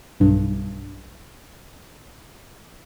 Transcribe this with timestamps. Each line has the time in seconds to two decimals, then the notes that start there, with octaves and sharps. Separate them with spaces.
0.20 B1 G2